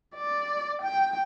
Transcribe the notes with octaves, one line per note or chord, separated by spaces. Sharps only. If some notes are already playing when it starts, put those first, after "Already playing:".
D5
G5